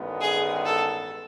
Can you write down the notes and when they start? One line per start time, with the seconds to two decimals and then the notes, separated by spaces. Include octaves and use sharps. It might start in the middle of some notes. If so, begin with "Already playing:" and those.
Already playing: A1 G2 D#3 G#3 B3
0.21 G#4
0.66 A4